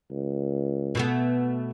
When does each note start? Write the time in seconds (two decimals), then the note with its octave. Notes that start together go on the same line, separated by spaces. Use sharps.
0.10 C#2
0.95 B2 A3 B3